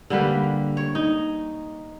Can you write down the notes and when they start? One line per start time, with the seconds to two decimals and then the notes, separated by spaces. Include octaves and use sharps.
0.10 D3 G3 A#3 B4
0.77 C#5
0.95 D#4